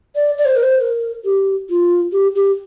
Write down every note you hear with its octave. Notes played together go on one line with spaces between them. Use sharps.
D5
D5
C5
A#4
C5
A#4
G4
F4
G4
G4